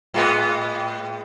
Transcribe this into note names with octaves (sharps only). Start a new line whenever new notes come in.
A2 G#3 B3